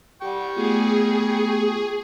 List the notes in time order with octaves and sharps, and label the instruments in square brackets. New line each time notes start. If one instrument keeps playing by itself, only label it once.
[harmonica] G3 G5 C#6 [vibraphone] G4 F#5
[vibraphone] A3 B3 F4 [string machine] G#4